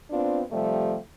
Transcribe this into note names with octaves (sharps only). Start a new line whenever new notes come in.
B3 C4 D4 F4
C3 F3 G3 A3